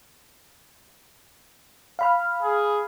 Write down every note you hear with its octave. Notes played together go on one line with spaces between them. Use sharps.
F5 B5 F6
G#4